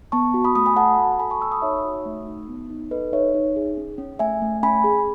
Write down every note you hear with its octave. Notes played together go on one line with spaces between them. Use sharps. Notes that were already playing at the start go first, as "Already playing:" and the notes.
B3 A5 C#6
F#4
B5 D#6
A3 B5 D#6
G#5 B5
A4 F#5 A5
F#4
A5
A4 G#5 B5
A5 C#6
A4 C#6 E6
B5 D#6
D#4 C#5 E5
F#4
A3
D#4
B3
D#4
A4 B4 D#5
D#4 C#5 E5
D#4
G#4
C#4
C#4
A3 E5 G#5
A3
C#4 G#5 B5
G#4